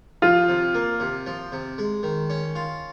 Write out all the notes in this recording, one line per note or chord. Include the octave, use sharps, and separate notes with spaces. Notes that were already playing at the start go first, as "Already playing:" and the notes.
F3 F4
C3
A#3
C3
F3
C3
G#3
D#3
C#4
F4